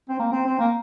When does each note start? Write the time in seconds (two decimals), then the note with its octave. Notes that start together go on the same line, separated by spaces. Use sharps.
0.09 C4
0.19 A#3
0.32 C4
0.46 C4
0.59 A#3